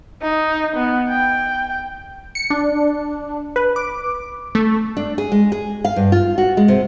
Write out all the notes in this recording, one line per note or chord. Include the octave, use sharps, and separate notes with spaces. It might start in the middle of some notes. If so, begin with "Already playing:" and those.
D#4
B3
G5
C#7
D4
B4
D6
A3
D4
G#4
G#3
G#4
F5
G2
F4
F#4
G#3
C3